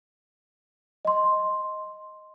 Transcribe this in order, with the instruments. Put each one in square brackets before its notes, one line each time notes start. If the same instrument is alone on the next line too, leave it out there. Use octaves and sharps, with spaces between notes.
[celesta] D#5 C6